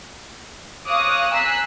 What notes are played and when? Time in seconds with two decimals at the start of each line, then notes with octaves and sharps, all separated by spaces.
0.87 C#5 F5 D6 D#6 F#6 A#6
1.32 G#5 A#5 E6 F#6 B6 C7